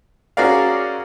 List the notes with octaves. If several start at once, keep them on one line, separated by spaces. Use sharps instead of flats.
C#4 F#4 G#4 A#4 D5 F5